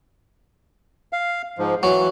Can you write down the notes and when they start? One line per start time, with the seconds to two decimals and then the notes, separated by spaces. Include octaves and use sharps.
1.13 F5
1.58 G#2 F3
1.83 E3 F#3